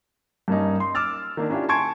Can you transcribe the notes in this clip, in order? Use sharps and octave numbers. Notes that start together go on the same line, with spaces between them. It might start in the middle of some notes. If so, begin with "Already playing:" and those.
G2 A#3 C#4 D#4
C6
D6 E6 F6 A6
D#3 A#3 D4
C#4 D4 E4 F4 G4
G#5 A5 C6 C#6 G#6 D7